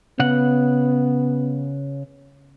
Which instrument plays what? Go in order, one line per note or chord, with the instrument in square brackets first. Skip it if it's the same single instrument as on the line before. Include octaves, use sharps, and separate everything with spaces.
[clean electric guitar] C#3 F#5 [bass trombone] B3